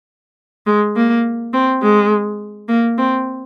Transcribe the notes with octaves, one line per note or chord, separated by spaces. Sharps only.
G#3
A#3
C4
G#3
A#3
C4